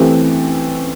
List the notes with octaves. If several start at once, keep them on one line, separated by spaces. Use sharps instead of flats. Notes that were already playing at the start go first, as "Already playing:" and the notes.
Already playing: E3 A3 C4 G4